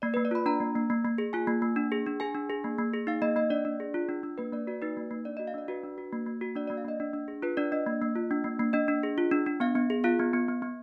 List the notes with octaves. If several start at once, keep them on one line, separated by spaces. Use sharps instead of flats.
A#3 D5
B4
A#3
D5
F4 B5
D4 A#5
A#3
A#3
A#3
A#3
G#4
F4 G#5
A#3
A#3
D4
G#4
D4
G#4 G#5
D4
G#4
A#3
A#3
G#4
D#4 F5
A#3 D#5
A#3 D#5
D4 D5
D4
G#4
F4
D4
D4
A#3 B4
A#3 D5
F#4 D5
D#4 B4
A#3
A#3
D4 D5
D#5
F#4
F5
D4 D5
F#4 B4
D4
F#4
A#3
A#3
F#4
D4 D5
A#3 D5
F5
A#3 D#5
D4
D4
G#4
F4 B4
D4 D5
D4 D#5
A#3
A#3
F4
D4
A#3
A#3
D4 D#5
D4
G#4
F4
D4
D4
B3 F5
B3
G#4
F4 F5
B3
B3
B3
B3